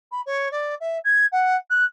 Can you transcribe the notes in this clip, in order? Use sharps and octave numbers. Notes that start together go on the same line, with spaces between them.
B5
C#5
D5
E5
G#6
F#5
F#6